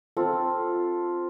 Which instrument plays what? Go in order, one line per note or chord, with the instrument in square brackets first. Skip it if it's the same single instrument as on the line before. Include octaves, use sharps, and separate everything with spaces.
[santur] C4 F4 A4